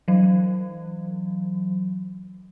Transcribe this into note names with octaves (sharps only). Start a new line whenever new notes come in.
E3 F#3